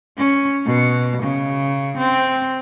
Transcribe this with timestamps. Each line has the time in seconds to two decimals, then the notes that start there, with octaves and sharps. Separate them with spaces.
0.18 C#4
0.66 B2
1.23 C#3
1.98 C4